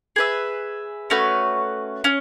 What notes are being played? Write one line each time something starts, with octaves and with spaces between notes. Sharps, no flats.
G#4 B4 E5
A3 C#4 F#4 B4
C#4